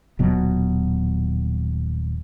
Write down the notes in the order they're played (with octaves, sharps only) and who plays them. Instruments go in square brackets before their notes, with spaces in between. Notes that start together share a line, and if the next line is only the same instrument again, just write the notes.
[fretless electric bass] D#1 B2 F#3